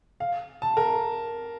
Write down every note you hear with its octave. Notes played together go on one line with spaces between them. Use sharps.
F5
A5
A#4